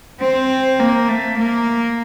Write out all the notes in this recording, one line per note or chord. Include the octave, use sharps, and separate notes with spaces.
C4
A#3
A3
A#3